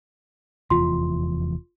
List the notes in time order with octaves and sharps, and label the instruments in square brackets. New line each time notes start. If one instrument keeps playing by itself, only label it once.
[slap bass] F1 E2 E3 [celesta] F4 C6